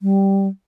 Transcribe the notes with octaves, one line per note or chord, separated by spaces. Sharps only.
G3